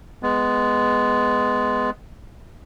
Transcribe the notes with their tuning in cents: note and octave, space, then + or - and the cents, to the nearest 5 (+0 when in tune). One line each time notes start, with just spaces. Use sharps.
G#3 +0 B3 +10